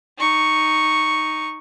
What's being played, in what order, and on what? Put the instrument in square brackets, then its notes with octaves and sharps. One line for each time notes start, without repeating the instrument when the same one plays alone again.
[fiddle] D#4 C#6